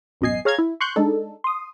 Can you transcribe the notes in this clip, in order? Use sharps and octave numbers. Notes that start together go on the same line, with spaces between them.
A1 F#2 B2 D#5 G#5 C7
G#4 C#5 F5 A#5 F6 G#6
E4
C6 C#6 F#6 G6
G#3 D4 D#4 A4
C6 D#6